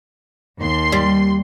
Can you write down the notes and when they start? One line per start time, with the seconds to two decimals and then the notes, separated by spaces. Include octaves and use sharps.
0.59 D#2 C6
0.92 G3